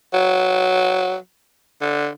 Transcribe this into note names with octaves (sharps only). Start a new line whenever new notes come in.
F#3
D3